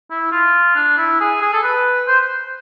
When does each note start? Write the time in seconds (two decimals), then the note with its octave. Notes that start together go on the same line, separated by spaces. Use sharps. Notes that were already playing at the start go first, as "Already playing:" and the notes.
0.11 E4
0.32 F4
0.75 D4
0.98 E4
1.20 G#4
1.42 G#4
1.53 A4
1.63 B4
2.08 C5